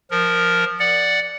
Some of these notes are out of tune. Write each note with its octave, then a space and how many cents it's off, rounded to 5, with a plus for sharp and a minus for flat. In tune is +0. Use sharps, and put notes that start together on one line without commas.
F3 +0 A#4 +0
D5 +0 F#5 +0